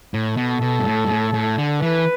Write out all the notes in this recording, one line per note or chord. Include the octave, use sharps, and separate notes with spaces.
A2
B2 A4
B2
G2
A2
G2
A2
A2
D3
E3 B4